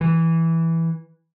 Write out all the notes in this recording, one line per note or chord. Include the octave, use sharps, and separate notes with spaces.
E3